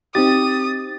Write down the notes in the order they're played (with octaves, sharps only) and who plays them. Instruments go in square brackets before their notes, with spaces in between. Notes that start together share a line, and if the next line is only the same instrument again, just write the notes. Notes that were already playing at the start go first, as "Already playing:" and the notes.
[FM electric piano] C4 D#4 A6 [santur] G4 [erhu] D#6